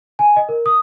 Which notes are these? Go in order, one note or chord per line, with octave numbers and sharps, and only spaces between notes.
G#5
D#5
A#4
D#6